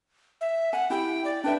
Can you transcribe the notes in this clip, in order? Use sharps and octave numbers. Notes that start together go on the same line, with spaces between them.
E5
F#5 G#5
E4 G4 G5
D5
D4 B4 E5 G5